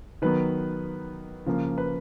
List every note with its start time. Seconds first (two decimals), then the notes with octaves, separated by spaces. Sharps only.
0.22 D#3 F#3 B3 B4
1.46 C#3 F3 A#3
1.78 B4